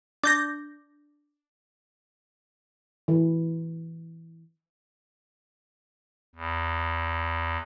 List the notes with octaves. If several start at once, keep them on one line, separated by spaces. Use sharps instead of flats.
D4 G6 A#6
E3
E2